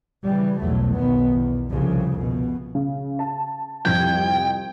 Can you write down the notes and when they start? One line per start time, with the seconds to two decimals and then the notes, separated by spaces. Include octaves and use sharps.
0.24 C#3 E3 G3
0.60 B1 E2 B2 F#3 A3
0.93 B1 D#3 B3
1.31 E2
1.70 C2 F2 C#3
2.18 B2
2.75 C#3
3.19 A5
3.85 C2 F2 G5 G#6